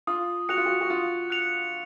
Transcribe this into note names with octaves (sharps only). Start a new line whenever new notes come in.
F4 D#6
F#4 F#6 C#7 F7
F4
F#4
F#4
F4 D#6
F#6 C#7 F7